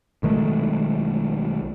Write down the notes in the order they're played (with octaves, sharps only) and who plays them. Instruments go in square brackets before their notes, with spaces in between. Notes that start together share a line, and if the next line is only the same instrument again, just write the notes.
[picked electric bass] B1 D#3 G#3 A3